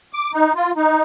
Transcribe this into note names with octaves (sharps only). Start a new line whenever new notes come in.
D6
D#4
F4
D#4